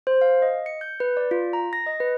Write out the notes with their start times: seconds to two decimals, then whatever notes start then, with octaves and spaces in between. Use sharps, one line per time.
0.07 C5
0.21 F5
0.42 D#5
0.66 C#7
0.81 G6
1.00 B4
1.17 D5
1.31 F4
1.53 A#5
1.73 A#6
1.87 D#5
2.00 B4